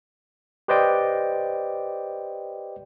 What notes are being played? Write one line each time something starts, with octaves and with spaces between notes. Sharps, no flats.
G4 B4 C5 D5 D#5 G5